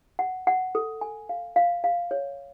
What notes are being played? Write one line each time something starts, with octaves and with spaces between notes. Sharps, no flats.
F#5
F#5
A4
G#5
F5
F5
F5
C#5